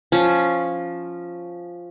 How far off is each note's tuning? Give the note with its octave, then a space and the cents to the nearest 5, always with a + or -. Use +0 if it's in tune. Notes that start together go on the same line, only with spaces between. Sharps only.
F3 +0 C#4 +0